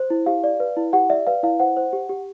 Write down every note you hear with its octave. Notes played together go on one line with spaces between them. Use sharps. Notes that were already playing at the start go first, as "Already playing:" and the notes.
Already playing: C5
E4
G4 F5
D5
B4
E4
G4 F#5
D5 E5
B4 F5
E4 F5
C5 F#5
C5
G4
G4